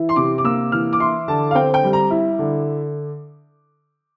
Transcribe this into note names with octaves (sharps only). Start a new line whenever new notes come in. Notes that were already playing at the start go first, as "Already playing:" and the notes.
Already playing: E3 E4
C6
C3 D6
D6
A#3 E6
E3 F6
D6
E4 C6
D3 A5
F5
C4 G5
G5
G3
A#5
E4
D3